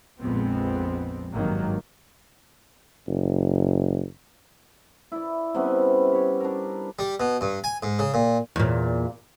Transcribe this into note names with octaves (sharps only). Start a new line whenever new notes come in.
A#1 F2 G#3 B3 C4
G#1 G2 D#3 F#3 A#3
F#1
E4 D5
C3 G3 B3 C#4
G4 C#5
D4 A#4
G3
B2
G2
G#5
G#2
C#3
A#2
E2 A#2